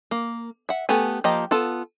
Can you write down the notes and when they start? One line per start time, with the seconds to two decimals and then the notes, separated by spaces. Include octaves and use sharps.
0.11 A#3
0.69 E5 F#5
0.89 A3 B3 G4 G#5
1.24 F3 A#3 G4 D#5 A#5
1.51 B3 F4 A4 A5